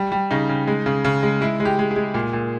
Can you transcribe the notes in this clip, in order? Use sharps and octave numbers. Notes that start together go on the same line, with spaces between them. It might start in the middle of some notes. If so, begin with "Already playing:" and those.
Already playing: G3
G3
C#3 D#4
C#3
G#3
C#3
C#3
G#3
G#3 E4
G#3
G4
G#3
G#4
G#3
A#2
A#2